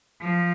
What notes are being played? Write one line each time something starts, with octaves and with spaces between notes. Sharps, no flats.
F3